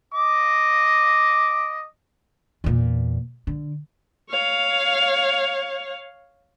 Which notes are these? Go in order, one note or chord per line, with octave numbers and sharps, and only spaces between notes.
D#5 D6
E2 A#2
D3
C#5 F5